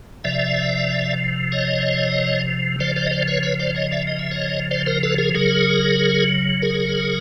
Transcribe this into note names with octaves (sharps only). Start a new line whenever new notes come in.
C3 F3 D5 E5
C#5 D#5
C#3 F3 C5 D5
C5 D5
D#5
C5 D5
B4 C#5
B4 C#5
C5 D5
C#5 D#5
D5 E5
D#5
E5
C#5 D#5
C5 D5
A#4 C5
A4 B4
G#4 A#4
C#3 F#3 G#4 A#4
G#4 A#4